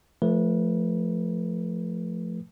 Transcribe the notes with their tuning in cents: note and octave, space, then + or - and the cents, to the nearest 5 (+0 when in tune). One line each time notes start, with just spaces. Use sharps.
F3 +0 A3 +0 B4 -30